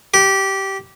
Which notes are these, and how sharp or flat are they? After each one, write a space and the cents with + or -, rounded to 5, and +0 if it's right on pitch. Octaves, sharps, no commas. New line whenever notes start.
G4 -15